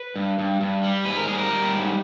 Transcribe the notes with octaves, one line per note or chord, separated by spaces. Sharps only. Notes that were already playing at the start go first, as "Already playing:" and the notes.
Already playing: B4
G2
G2
G2
G3
G#2 B4
A#4
G3 G#4
A#4
G3
G#2